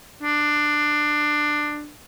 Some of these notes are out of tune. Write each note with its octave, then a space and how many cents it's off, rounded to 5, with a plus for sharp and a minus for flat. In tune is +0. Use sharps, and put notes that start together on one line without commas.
D4 +15